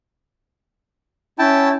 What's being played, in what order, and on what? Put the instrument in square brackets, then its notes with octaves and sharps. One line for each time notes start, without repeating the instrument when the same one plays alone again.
[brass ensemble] C#4 [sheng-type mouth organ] E4 G5 A5